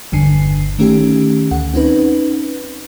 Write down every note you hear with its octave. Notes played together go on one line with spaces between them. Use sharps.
G1 E2 G2 D3 G#5 C7
D#3 A3 C#4 G4
D2 F#5
C4 C#4 D#4 B4